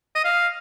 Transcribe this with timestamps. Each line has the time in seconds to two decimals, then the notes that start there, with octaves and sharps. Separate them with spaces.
0.15 D#5
0.24 F5